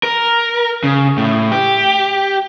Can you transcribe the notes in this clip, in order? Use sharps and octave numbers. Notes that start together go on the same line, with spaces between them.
A#4
C#3
A2
G4